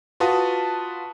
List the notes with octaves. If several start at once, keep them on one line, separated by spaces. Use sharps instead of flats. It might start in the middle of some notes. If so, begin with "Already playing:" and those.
F4 F#4 B4 A5 D#6